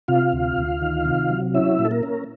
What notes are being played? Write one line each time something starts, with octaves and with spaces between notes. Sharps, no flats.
C3 F4 F5
D2
D2
D#3
C3
F#3
C#4 E4 E5
A#2
A4
A#3 A#4
C#4